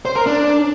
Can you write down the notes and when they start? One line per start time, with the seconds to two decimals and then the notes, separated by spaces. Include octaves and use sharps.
0.05 C5
0.16 A#4
0.27 D4